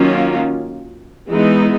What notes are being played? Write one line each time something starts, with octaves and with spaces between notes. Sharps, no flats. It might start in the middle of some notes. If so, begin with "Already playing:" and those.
Already playing: D#3 F#3 A#3 C#4 F4
E3 G#3 B3 D#4